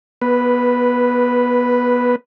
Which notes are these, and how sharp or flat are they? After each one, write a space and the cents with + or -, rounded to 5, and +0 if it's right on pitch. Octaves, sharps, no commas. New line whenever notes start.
B3 -20 B4 +0